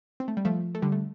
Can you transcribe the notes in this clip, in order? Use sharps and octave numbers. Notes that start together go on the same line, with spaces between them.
C4
A3
G3
F3 A3
A3
D3 G3
A3